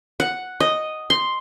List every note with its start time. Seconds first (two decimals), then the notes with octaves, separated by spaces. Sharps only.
0.20 F#5
0.60 D#5
1.10 C6